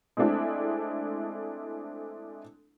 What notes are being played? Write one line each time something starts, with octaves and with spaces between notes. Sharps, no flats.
G#3 A3 C4 D4 E4 A4